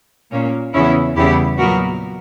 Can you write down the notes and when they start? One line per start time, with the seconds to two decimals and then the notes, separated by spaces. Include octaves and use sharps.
0.31 A#2 A#3 C#4
0.73 E2 C#3 E3 B3 C#4 E4
1.16 E2 C#3 G3 B3 E4 G4
1.58 A#2 F#3 B3 F#4 A#4